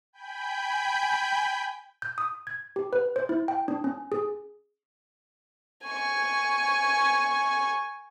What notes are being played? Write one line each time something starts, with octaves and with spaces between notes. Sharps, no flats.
G5 G#5 B5 G6
G6
D#6
G#6
G4
B4
C5
E4
G5
D4
C#4
G#4
G#5 C#6